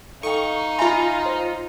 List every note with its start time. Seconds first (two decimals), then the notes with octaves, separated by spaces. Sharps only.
0.23 D#4 A4 F5 G5 C#6
0.79 F4 E5 G#5 A#5 B5
1.26 C5